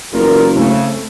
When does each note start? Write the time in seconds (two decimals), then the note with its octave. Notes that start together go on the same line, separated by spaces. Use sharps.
0.13 F#1 E2 F4 A#4
0.54 C#3 A3 C4